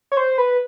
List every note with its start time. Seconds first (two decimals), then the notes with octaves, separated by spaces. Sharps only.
0.12 C#5
0.17 C5
0.38 B4